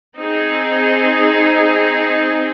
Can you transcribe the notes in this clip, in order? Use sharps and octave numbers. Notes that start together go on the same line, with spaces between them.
C4 D#4 G#4